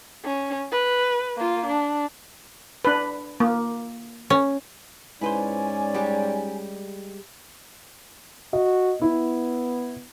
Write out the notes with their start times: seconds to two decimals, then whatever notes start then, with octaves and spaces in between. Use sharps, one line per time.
0.25 C#4
0.72 B4
1.37 A#3 F4
1.66 D4
2.85 D4 B4
3.40 A#3
4.30 C#4
5.21 G#2 C#4 E4 B4 C5 D5 G#5
5.94 G3 G#3 G4
8.53 F#4 D#5
9.02 B3 E4